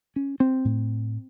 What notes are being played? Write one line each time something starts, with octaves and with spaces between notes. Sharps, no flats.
C#4
C4
A2